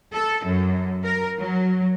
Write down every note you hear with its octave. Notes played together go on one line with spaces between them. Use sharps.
A4
F#2
A#4
F#3